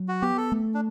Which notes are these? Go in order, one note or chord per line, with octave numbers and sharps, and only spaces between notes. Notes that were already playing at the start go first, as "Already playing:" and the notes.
Already playing: F#3
F#4
B3 G4
A4
A3
D4